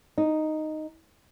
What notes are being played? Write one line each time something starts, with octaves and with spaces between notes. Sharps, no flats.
D#4